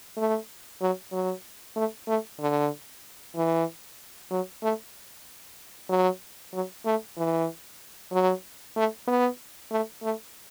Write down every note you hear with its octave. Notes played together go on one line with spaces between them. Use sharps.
A3
F#3
F#3
A3
A3
D3
E3
F#3
A3
F#3
F#3
A3
E3
F#3
A3
B3
A3
A3